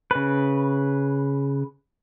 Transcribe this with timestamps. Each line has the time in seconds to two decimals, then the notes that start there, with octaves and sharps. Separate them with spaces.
0.11 C#3 B4